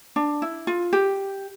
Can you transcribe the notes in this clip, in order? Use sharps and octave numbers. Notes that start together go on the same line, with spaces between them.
D4
E4
F4
G4